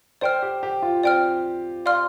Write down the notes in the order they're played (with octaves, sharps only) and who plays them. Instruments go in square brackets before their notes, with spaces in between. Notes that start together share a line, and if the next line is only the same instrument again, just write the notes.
[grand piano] C5 [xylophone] D5 G5 F6
[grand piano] G4
G4
F4
[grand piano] C4 [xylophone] D5 G5 F6
[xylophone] D5 F5 C6 F6